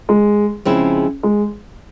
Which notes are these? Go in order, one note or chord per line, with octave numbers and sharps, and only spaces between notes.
G#3
C#3 F3 G#3 C4 E4
G#3